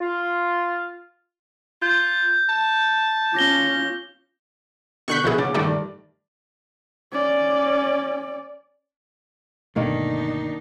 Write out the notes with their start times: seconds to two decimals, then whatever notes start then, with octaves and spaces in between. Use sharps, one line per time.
0.01 F4
1.82 F4 G6
2.49 A5
3.34 C#4 F4 D6 A#6 G7
5.08 B2 D3 C#6 F#6 G6 B6
5.24 A#1 B2 E4 G#4
5.38 C#3 F#5 D6 A6
5.54 G2 D#3 A3 G4 D5
7.12 C#4 D5
9.76 G1 B2 D#3 A3 A#3 D4 D#4